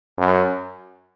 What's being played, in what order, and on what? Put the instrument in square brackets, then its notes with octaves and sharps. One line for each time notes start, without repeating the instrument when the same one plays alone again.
[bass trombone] F#2